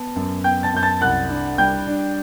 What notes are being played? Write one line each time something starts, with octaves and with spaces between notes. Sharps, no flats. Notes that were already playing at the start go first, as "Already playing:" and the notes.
Already playing: B3 A5
F#2
B3 G5 G6
A5 A6
F#2 G6
A5 A6
C2 F#5 F#6
D4
G3 G5 G6
D4